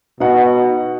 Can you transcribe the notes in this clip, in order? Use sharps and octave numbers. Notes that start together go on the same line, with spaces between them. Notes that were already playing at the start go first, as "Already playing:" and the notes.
B2 D#4 F#5